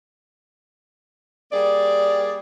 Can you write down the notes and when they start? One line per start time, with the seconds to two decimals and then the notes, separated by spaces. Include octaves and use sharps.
1.52 G3 A#3 G#4 D5